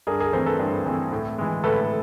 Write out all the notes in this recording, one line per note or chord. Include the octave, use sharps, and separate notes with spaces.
G2 G#4 A#4
G#4 A#4
E3 A3 C4 A#4 C5
A4 B4
G2
E3 A3 C4
A2
E3 G#3
A2 A4 B4